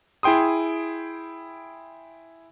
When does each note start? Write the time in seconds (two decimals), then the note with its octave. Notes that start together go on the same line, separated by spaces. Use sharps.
0.23 E4 G#4 G5 C6 D#6